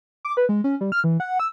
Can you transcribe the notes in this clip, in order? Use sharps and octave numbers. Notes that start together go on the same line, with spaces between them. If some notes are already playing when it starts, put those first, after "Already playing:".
D6
B4
G#3
C#4
G3
F6
E3
F#5
E6